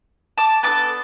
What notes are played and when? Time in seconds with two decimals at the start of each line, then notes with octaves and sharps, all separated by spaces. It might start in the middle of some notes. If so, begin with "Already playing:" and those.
0.38 A5 D6
0.63 B3 D4 A4 A5 D6